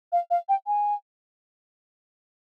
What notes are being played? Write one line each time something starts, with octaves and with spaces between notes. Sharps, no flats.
F5
F5
G5
G#5